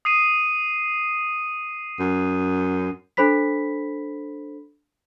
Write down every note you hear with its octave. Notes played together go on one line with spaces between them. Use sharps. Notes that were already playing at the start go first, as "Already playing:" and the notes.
D#6 C7 D#7
F#2
D4 A4 C5 B5 B6